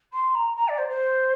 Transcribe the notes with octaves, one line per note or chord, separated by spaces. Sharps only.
C6
A#5
A#5
D5
C5
C5